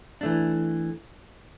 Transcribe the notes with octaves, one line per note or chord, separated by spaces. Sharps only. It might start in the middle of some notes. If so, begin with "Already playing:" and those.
E3 A3 D4